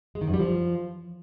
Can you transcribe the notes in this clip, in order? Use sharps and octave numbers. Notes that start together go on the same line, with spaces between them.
G#3
D#3
F#2
G3
F3